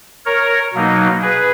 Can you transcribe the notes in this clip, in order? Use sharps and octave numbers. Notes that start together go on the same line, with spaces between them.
A#4 C#5
B2 F#3 A#3 D#4
G#4 B4